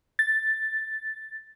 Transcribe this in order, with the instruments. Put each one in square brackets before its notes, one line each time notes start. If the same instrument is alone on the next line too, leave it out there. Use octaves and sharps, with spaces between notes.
[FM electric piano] A6